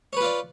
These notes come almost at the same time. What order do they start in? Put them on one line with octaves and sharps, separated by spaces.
C#5 B4 F4 D5